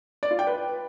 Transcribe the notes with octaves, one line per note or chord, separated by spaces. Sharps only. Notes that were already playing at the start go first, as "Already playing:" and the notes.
D5
F4
G5
B4